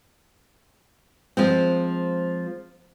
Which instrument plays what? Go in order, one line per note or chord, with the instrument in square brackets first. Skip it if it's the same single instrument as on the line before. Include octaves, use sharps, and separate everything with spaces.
[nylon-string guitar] F3 G#3 C4